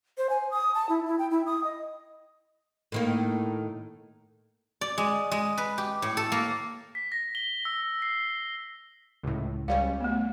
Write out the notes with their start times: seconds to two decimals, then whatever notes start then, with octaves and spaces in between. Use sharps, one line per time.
0.18 C5
0.30 G#5
0.51 D#6
0.75 A5
0.89 E4
1.06 E4
1.19 G5
1.31 E4
1.46 D#6
1.64 D#5
2.92 A2 D#3 A#3
4.81 D5
4.98 G#3
5.32 G#3
5.57 B4
5.78 G4
6.02 A2
6.17 A4
6.32 A#3
6.95 B6
7.12 A#6
7.35 G7
7.65 E6
8.02 C7
9.23 C#2 A2
9.68 C#2 G3 C#4 F5
10.01 A3 B3